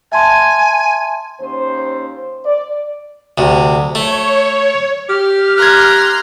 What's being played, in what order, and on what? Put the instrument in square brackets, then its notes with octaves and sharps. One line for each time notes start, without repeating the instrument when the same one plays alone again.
[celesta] E5 A5 C6 [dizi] G#5
[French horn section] D#2 C#4 C5
[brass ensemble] D5
[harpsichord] D2 C3
[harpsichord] A3 [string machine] C#5
[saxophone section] G4 [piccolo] F6
[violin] A#5 C6 [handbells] F#6 G#6